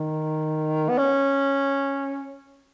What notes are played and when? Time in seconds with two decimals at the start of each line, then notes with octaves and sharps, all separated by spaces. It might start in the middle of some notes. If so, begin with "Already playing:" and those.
Already playing: D#3
0.89 B3
0.98 C#4